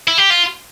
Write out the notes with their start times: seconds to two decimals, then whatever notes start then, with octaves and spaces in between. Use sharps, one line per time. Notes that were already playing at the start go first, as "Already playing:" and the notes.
0.08 E4
0.18 G4
0.30 F4